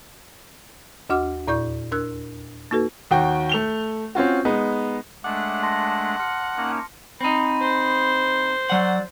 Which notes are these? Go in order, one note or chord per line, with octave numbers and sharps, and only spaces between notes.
D#2 D4 F#4 F#5 D6 F6
E2 A#2 E4 D5 C#6 G6
D4 A#4 E6 F#6
A#3 D#4 F#4 A4 B4
D#2 F#4 G5
A3 F7 G7
C4 C#4 F4 F#4
G#3 B3 D#4
G#3 A3 D4 F#5 D6
A5 C6 A#6
C6 F6 C#7
A#3 C#4 D#4
C4 D#4 B5
C5
F#3 D5 F#5